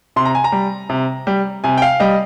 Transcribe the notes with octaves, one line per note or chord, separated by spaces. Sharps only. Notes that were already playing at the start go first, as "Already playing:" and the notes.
C3 C6
A#5
G#5
A#5
G3
C3
G3
C3 G#5
G5
F5
G3 D#5